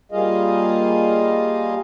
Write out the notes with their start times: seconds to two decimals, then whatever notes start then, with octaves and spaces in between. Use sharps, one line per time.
0.12 G3 A#3 F4 G#4 D#5 F5